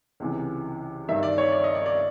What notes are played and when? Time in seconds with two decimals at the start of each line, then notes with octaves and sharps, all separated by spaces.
0.20 C#2 C3 E3
1.08 G2 D#3 E5
1.23 D5
1.38 C#5
1.53 D5
1.64 D#5
1.75 D5
1.86 D5